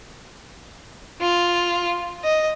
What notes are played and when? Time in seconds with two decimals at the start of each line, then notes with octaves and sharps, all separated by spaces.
1.21 F4
2.24 D#5